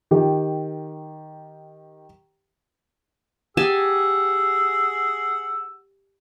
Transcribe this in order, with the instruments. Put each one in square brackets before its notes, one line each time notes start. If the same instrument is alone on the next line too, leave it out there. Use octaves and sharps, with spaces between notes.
[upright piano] D#3 G4
[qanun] G4 G#5 A5 [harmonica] G#4 F#5 E6